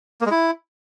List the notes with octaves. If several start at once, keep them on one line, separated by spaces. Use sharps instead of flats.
A#3
G#3
E4